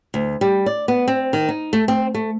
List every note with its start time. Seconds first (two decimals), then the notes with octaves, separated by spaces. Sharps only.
0.14 D2
0.41 G3
0.66 D5
0.88 B3
1.08 C4
1.33 D#3
1.49 D#4
1.73 A3
1.88 C4
2.14 A3